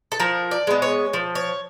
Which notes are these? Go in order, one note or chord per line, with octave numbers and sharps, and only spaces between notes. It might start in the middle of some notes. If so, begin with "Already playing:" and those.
A4
F3 A#4
D5
G#3 B3
C#5
F3
C#5